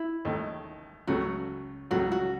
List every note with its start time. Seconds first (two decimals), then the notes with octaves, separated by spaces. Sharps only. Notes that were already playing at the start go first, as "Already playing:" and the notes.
Already playing: E4
0.25 D#2 D#3 A3
1.07 C#2 C#3 F#3 A3 F#4
1.90 C#2 C#3 F#3 A3 F#4
2.12 F#4